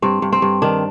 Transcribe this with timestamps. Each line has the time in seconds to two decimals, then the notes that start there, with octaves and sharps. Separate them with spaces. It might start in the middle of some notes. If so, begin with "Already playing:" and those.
0.02 G2 C4
0.22 G2
0.33 C4
0.42 G2
0.62 D#3 D4